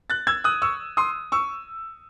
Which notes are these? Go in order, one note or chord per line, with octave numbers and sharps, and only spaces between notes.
F#6 A6
E6 G#6
D#6 F#6
C#6 E6
C6 D#6
C#6 E6